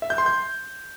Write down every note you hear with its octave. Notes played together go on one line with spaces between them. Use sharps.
E5
G6
C6
G6